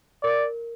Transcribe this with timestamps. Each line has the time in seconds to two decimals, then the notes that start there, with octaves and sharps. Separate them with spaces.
0.23 A#4 D5